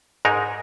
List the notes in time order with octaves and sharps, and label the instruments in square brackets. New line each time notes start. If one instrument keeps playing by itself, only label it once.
[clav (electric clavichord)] G#2 G#3 D#4 A#4